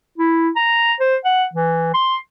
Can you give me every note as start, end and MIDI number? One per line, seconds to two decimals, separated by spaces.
0.18 0.49 64
0.56 0.93 82
1.00 1.16 72
1.25 1.45 78
1.54 1.90 52
1.94 2.17 84